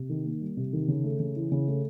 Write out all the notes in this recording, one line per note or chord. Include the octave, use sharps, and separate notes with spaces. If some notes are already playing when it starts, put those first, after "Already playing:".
Already playing: C3
D#3
A#3
G3
C3
D#3
C#3
A3
C#3
E3
C#3
A3